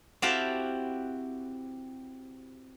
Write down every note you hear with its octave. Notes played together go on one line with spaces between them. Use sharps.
C4 E4 F#4 G4 F5 A5